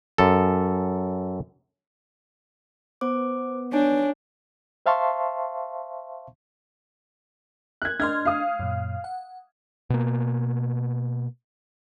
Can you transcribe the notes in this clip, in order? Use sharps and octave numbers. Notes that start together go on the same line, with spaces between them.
F#2 A4
B3 C5 D6
D4 C#5 G#5
C5 E5 F5 A5 C6 C#6
F#6 G#6
D4 D#5 C6 F6 G#6
F5 D#6
F#2 A#2
F#5
B2 A#3